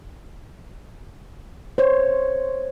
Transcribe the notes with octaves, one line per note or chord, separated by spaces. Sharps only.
C5 C#5